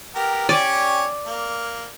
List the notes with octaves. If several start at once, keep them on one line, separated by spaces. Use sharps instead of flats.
B3 G4 A#4
C#4 G4 C#5 D5
A#3